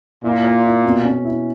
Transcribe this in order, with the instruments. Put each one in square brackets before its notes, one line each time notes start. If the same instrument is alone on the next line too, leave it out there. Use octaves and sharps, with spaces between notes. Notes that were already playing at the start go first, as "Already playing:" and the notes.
[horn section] A#2 [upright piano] E4
[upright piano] A#4
E4
B2
C#4
E4